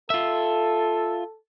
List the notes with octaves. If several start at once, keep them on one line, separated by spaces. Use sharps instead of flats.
F4 A4 E5